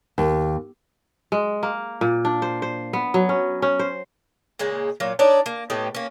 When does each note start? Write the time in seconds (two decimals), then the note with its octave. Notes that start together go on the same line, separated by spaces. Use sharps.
0.18 D#2
1.32 G#3
1.63 A#3
2.01 A#2
2.25 D4
2.42 C5
2.62 C5
2.93 B3
3.14 F#3
3.29 C#4
3.62 C#4
3.79 C5
4.59 A#2 C#3 G#3 A#3
5.00 A#2 F#3 F5
5.19 D4 D#4 C#5 D5
5.46 A#3
5.70 A2 B3 G4 D#5
5.95 A#3 C#4